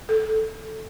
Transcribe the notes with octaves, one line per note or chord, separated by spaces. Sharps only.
A4